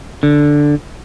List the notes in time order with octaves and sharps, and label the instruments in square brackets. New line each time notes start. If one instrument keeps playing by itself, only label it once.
[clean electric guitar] D3